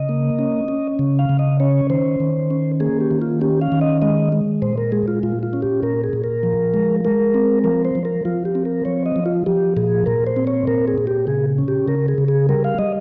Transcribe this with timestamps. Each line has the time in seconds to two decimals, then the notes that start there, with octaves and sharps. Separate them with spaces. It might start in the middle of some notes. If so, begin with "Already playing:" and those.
Already playing: C#3 D#5
0.09 A#3
0.39 C#4
0.68 C#4
0.99 C#3
1.19 F5
1.29 C#3
1.39 D#5
1.60 C#4 C#5
1.90 D#3 C5
2.20 D#3
2.50 C#4
2.80 A#3 G#4
3.01 G4
3.11 D#3
3.22 F4
3.41 C#4 G4
3.61 F5
3.72 D#3
3.81 D#5
4.02 G#3 D#5
4.32 G#3
4.62 A#2 C5
4.78 A#4
4.92 G#3 G#4
5.08 F4
5.23 A#2 F4
5.43 F4
5.53 C#4
5.62 G4
5.83 A#2 A#4
6.04 G#4
6.13 A#2
6.24 A#4
6.43 F3
6.74 G#3
7.05 G#3 A#4
7.34 C4
7.64 F3 A#4
7.85 C5
7.95 F3
8.05 A#4
8.25 F3 F4
8.45 G4
8.55 C4
8.65 A#4
8.85 F3 C#5
9.06 D#5
9.16 F3
9.26 F4
9.46 F3 G4
9.77 A#2 G#4
10.06 A#2 A#4
10.27 C5
10.36 C4
10.47 C#5
10.67 A#2 A#4
10.88 G#4
10.98 A#2
11.07 G4
11.27 C#3 G#4
11.58 C#4
11.68 G4
11.88 C#3 A#4
12.08 G#4
12.18 C#3
12.28 G#4
12.49 G3 A#4
12.64 F5
12.79 G3 D#5